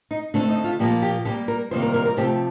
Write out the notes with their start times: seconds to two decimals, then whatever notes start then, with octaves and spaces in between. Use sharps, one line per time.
0.11 D#4
0.34 D3 A3 C4 D4
0.49 D#4
0.64 F4
0.79 A#2 F3 A#3 G4
1.02 G4
1.25 D3 G3 A#3 G4
1.48 A#4
1.71 C3 D#3 G3 A#3 C5
1.83 A#4
1.94 A#4
2.06 A#4
2.17 C3 F3 A3 C4 G4